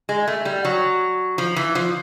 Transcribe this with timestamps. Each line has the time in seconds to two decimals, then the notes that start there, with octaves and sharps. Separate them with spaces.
0.09 G#3
0.28 A3
0.45 G3
0.65 F#3
1.38 F3
1.56 E3
1.75 F3